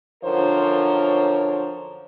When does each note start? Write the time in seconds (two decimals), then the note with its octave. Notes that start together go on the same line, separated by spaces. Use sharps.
0.24 F#2 D3 F3 A#4 C5 C#5